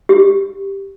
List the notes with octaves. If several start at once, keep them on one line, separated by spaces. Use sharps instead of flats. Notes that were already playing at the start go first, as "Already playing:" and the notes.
G4